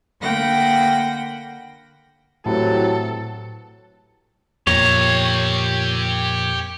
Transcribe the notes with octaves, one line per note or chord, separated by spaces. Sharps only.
D3 A#3 F#5 G5 B5 A#6
A2 E3 F#3 C4 G4 A4
F2 A#2 G4 C#5 A#5